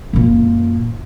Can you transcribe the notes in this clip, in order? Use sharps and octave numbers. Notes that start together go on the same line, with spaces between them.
F#2 A#2